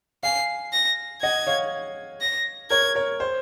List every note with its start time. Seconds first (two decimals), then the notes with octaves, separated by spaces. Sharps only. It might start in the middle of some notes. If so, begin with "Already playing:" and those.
0.23 F5 G#5 C7
0.73 A#6
1.22 D#5 F#5 G#6
1.47 C#5 F5
2.21 A#6
2.70 A#4 C#5 G#6
2.95 A#4 C#5
3.20 C5